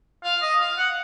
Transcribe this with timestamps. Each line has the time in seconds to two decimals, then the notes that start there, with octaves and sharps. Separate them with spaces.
0.24 F5
0.42 D#5
0.60 F5
0.78 F#5